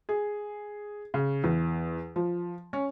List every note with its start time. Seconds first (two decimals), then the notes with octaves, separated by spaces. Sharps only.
0.09 G#4
1.14 C#3
1.44 E2
2.16 F3
2.73 C#4